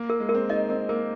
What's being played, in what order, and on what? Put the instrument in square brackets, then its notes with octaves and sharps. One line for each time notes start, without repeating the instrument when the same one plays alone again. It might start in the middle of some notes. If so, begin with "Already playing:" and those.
Already playing: [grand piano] A#3
[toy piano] A#4
[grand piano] G#3
[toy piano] A#4
[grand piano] C4
[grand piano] D#4 [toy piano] D#5
[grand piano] C4 [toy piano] A#4
[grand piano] A#3 [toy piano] A#4